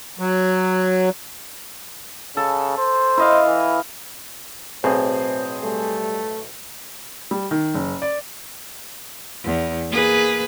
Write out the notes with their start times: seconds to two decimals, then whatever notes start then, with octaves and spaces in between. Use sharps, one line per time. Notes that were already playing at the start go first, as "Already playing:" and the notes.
0.19 F#3
2.37 C#3 A4
2.78 C5
3.17 E4 D#5 F5
3.46 E3
4.84 B1 A2 C4 G#4 C5
5.64 G3 A3
7.31 G3
7.51 D#3
7.74 F#1
8.02 D5
9.44 E2
9.90 A#3 G#4 B4